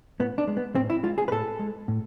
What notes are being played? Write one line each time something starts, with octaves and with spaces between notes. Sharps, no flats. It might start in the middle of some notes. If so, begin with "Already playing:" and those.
A2 B3
D4
G#3
B3
A2 C4
E4
G#3 F4
G#4
B4
A2 A4
G#3
A2